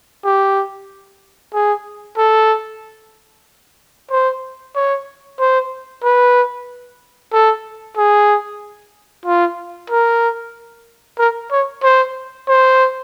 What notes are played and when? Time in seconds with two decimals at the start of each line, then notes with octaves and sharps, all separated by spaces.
0.25 G4
1.54 G#4
2.17 A4
4.11 C5
4.76 C#5
5.40 C5
6.04 B4
7.33 A4
7.97 G#4
9.26 F4
9.90 A#4
11.19 A#4
11.52 C#5
11.83 C5
12.48 C5